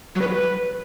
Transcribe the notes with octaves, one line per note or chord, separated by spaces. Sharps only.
F#3
B4
F#3
B4